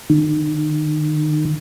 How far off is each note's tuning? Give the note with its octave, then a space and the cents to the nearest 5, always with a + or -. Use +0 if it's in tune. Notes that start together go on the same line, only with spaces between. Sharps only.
D#3 -35